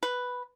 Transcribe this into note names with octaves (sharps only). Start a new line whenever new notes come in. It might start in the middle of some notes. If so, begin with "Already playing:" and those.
B4